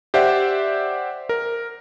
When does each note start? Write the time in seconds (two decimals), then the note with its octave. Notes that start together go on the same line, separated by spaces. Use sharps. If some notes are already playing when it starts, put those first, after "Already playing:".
0.14 G4 C5 D5 E5 F#5
1.29 A#4